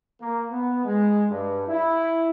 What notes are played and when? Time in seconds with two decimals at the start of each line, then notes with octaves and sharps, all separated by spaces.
0.21 A#3
0.52 B3
0.85 G#3
1.30 G2
1.68 E4